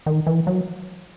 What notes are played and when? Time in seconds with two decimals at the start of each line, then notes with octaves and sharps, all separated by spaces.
0.06 D#3
0.27 E3
0.47 F#3